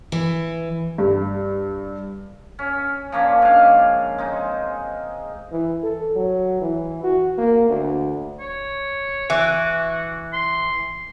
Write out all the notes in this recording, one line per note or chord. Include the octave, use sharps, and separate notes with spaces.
E3
G2
C#4
F3 A#3 C#4 D4
G#2 F5
G#3 C4 D#4
E3
A4
F#3
E3
F#4
A#3
D2
C#5
E3 F#4
C6